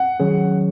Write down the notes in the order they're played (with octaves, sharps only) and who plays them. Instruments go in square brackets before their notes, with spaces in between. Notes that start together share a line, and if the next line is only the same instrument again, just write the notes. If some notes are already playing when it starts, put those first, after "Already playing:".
Already playing: [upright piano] F#5
[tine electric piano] D#3 F#3 C#4 G#4 C#5